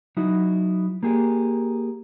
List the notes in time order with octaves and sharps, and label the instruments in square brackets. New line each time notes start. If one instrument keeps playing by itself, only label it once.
[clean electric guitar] F#3 D#4 E4 F#4
A#3 G4 G#4